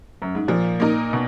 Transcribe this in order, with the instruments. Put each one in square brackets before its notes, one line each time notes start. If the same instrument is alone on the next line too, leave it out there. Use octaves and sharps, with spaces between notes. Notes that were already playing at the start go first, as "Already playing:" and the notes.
[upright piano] F#2
G#2
[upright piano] A#2 [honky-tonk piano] F3
[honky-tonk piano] A#3 D#4 A#4
[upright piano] B2